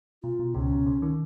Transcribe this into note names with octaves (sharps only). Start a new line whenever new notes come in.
B2 F4
B2
C#2 C#3 C#4
B2
C#2 C#3
D#3